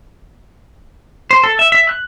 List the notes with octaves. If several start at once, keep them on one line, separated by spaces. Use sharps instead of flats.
C5
A4
E5
E5
F#6